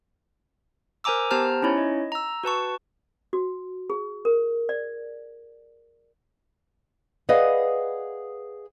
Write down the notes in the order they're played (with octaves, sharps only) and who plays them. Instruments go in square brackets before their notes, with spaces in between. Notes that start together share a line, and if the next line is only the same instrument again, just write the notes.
[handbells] A#4 C5 G#5 A#5 D6 E6
B3 G4 C5 A5 A#5 F6
C#4 D#4 E4 C#5
D#5
A#5 E6
F#4 B4 A5 C#6
[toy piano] F#4
G#4
A#4
D5
[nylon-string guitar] G#4 B4 D5 D#5 F5 F#5